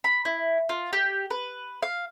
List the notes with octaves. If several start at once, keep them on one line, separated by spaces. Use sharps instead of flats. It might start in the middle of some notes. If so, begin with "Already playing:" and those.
B5
E4
F4
G4
B4
F5